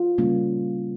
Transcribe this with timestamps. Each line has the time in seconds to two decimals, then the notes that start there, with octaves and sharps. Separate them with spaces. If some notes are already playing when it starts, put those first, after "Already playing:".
Already playing: F4
0.18 C#3 G3 A#3 C#4